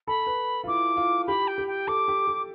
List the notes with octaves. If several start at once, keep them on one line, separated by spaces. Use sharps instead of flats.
A4 B5
B4
F4
E4 D6
F4
G4 B5
G5
G4
G5
A4 D6
G4
G4